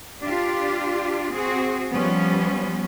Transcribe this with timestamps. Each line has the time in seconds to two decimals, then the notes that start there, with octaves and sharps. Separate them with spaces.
0.23 D4 F4 G4
1.34 C4 F#4 G#4
1.92 F3 G3 B3 C#4